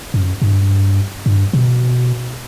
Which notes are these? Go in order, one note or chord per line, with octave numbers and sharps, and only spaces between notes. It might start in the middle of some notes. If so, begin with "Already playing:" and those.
F#2
G2
G2
B2